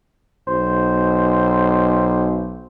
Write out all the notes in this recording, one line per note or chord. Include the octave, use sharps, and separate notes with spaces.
B1 C5